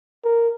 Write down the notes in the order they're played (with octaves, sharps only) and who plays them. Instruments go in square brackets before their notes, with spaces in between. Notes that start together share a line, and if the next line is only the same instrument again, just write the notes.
[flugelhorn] A#4